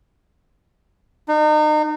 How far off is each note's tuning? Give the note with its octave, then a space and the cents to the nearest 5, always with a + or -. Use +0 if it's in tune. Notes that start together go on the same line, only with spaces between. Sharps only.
D#4 -35